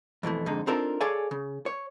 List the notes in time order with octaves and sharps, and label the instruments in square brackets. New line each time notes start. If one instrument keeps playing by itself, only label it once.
[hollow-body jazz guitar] F2 B2 E3 A3
F2 G#2 D3 D#4
C4 D4 D#4 F4 A4 A#4
G#4 A4 C#5 D5 F5 G#5
C#3
C#5